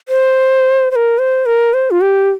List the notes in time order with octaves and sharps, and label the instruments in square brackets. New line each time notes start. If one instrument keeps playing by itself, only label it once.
[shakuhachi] C5
C5
A#4
C5
A#4
C5
F4
G4